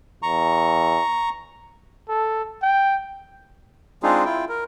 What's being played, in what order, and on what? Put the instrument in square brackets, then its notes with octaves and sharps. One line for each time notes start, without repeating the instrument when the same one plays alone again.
[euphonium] E2 [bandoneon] A#5 C#6
[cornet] A4
G5
[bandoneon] G#3 C4 D4 D#4 F4 G#4
E4 F4 G5
A#4